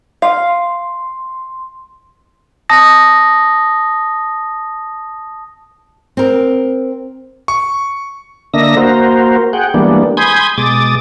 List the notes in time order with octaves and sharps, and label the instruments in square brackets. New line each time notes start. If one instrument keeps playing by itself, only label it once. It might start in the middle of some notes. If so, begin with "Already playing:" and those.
[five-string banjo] F5 [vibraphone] C6
[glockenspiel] A5 D#6 A#6
[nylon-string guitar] C4 A#4
[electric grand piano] C#6
[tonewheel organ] D3 A#3 D4 D#5 E5 A#6
A#3 F#4 A#4 C5
G#4 F#5 G5
E3 G3 G#3 A#3 B3 D4
G#5 B5 C6 D#6 G6 G#6
B2 G#3 D6 D#6 A6